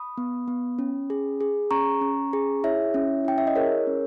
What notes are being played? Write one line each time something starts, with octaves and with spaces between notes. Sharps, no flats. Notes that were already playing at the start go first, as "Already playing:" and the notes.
Already playing: B5 D#6
B3
B3
C#4
G#4
G#4
C#4 A#5 C#6
C#4
G#4
E4 C#5 E5
C#4
E4 G5
E5
D#5
G#4 A#4 C#5
C#4